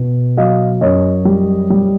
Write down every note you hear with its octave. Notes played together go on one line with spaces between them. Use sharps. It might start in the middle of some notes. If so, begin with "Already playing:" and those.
Already playing: B2
F#3 D#5 F5
F#2 C#5 D#5
G3
G3